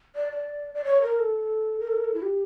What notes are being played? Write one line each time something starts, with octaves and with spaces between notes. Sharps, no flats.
D5
D5
D5
C#5
A#4
A4
A#4
A4
A#4
A4
E4
G4